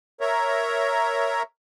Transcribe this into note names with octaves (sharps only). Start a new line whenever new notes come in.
A#4 C#5 E5 A#5